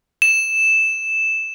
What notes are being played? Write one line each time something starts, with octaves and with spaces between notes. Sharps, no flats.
E7